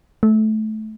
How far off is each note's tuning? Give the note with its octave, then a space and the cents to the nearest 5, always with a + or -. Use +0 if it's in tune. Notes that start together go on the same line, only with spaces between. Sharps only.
A3 -20